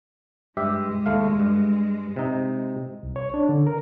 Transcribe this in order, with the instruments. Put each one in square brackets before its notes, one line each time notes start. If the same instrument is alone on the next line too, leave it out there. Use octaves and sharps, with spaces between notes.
[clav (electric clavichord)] G2 G4 E5 [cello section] G#3
[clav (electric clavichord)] D#2 A3 F5
G2
C3 D#4
[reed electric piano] C2
C#5
D4
D3
A#4